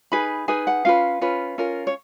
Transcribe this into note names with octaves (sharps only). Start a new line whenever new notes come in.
D#4 G#4 B4 B5
D#4 G#4 B4 G#5
F#5
C#4 F4 B4 F5
C#4 F4 B4
C#4 F4 A#4
C#5